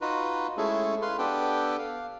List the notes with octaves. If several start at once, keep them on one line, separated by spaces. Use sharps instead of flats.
D#4 F4 F#4 B4
G#3 A3 C#4 E4 G#4 A4
B4 F5 C6
B3 D4 G4 A4 B4 G5
F5